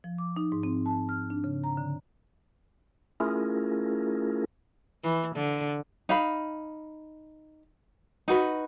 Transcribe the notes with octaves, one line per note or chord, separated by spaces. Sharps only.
F3
D6
D#4
G#2
C4
A5
F6
D4
C#3
A#5
D3
A3 C#4 E4 F4 G#4 A#4
E3
D3
D#4 F5 B5
D#4 F#4 B4